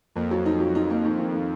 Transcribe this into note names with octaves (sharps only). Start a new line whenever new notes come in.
F2 A#3
F#3
D#4
F#3
D#4
A#3
D#3
D#3
D#3